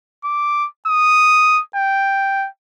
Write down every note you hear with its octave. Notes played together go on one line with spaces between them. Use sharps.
D6
D#6
G5